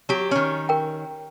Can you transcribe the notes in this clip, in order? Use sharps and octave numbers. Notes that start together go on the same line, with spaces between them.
F#3 G4
D#3 C#4
A#4 G5